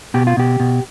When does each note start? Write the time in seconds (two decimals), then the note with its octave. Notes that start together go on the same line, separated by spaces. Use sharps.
0.14 B2 G4
0.27 F4
0.37 B2 G4
0.60 B2